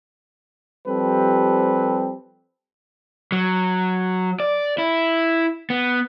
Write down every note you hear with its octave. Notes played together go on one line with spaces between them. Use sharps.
F3 G3 C4 G4 A4 B4
F#3
D5
E4
B3